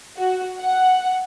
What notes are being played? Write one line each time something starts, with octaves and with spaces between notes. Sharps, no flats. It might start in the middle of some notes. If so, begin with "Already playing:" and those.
F#4
F#5